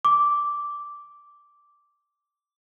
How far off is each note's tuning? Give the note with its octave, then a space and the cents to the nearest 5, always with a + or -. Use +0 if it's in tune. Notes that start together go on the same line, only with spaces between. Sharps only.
D6 -5